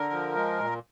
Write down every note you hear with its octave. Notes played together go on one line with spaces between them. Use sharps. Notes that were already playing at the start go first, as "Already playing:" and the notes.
Already playing: D3 A#4
F3
G#3
A#2